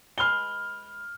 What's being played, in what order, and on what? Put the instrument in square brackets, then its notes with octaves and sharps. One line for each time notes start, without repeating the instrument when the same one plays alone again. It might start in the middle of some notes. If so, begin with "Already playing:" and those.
[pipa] G#3 B4 C6 [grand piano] F6 G7